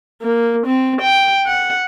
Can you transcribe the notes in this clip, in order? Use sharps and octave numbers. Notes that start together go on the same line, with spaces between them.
A#3
C4
G5
F#5